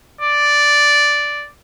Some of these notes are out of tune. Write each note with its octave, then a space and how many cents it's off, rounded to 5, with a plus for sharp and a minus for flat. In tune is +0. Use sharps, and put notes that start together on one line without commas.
D5 -5